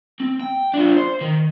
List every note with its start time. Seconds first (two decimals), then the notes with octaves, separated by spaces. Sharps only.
0.20 C4
0.40 G5
0.74 D4 F4
0.97 C5
1.21 D#3